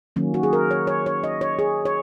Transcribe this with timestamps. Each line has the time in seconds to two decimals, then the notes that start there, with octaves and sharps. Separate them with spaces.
0.16 D#3 F#3 A#3 C#4
0.34 F#4
0.43 G#4
0.53 A#4
0.71 C#5
0.87 C#5
1.06 C#5
1.24 D#5
1.41 C#5
1.59 G#4
1.85 C#5